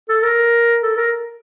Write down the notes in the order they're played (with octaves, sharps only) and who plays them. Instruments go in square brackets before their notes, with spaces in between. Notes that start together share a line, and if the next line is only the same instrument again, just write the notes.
[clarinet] A4
A#4
A4
A#4